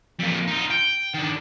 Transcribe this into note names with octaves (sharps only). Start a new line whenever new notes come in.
F2 A#3
D#4 F4
G5
D#3 D4